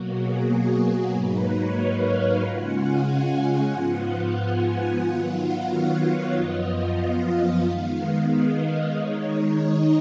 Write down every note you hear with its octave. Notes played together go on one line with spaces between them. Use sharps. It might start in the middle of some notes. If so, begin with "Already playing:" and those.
Already playing: B2 F#3 A#3 F#4
G#4
G#2 F#3 A#3 D#4 B4
C#5
F5
C#3 G#3 C#4 F4 F#5
G#5
F#5
F#5
G#2 F3 B3 F4
G#5
G#5
D#3 F#3 B3 F4 F#5
F5
C#5
C#5
F#2 F3 B3 F4 D#5
F5
F5
D#3 G#3 B3
D#5
D#3 G#3 D#4 C#5
D#5